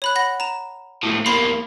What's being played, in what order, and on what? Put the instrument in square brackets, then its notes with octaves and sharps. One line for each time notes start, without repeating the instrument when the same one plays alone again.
[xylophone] C#5 B5 F#6
F#5 B5 A#6
A#5 E7
[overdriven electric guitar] A2 F3
[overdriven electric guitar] E2 A#3 [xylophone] B5 C6 C7